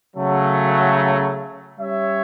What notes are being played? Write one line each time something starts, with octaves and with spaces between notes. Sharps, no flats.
C#3 F#3 A3
G3 C#4 G4 C#5 E5